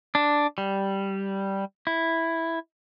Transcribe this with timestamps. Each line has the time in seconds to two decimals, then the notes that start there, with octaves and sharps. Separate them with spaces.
0.15 D4
0.58 G3
1.87 E4